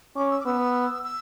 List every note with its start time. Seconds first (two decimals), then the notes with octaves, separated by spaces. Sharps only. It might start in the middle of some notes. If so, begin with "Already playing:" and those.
0.16 C#4 D6
0.31 E6
0.40 D6
0.46 B3 E6
1.04 E6